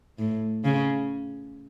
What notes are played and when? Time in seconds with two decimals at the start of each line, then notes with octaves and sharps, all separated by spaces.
0.19 A2
0.64 C#3